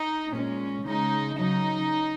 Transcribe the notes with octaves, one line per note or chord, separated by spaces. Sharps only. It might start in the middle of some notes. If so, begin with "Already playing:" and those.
Already playing: D#4
A#2 G#3 C#4
C#3 G#3 D#4
C#3 F#3 D#4